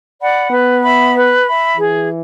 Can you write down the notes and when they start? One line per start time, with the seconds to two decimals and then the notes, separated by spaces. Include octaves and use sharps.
0.21 D5 F#5 B5
0.51 B3 B4
0.83 E5 B5
1.14 B4
1.46 E5 B5
1.76 E3 G#4